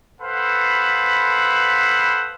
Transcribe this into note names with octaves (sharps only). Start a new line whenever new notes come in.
A4 B4 C5 F5 F#5 B5